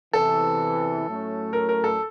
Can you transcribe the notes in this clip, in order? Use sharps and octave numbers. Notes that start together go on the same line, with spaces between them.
E2 C3 E3 A4
A2 F#3 A3 C#4
A#4
A#4
A4